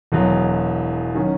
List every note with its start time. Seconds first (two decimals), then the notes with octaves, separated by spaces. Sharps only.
0.12 E1 E2 B2 F#3
1.15 D#3 F#3 C#4